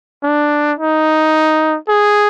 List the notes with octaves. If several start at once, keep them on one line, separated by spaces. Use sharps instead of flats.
D4
D#4
G#4